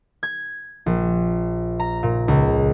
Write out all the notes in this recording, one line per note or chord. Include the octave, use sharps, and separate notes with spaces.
G#6
A#1
A#5
A#2
C#2